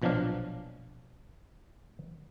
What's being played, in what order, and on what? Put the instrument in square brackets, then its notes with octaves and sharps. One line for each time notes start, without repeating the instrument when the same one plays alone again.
[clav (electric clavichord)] A#1 B2 F3 F#3 D4 F5